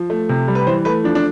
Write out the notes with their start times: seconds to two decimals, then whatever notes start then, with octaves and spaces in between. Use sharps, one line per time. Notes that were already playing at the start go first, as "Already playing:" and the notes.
Already playing: F3
0.10 A3
0.29 C3
0.48 G3
0.55 B4
0.67 E3 C5
0.85 A3 B4
1.04 F3 D4
1.15 D4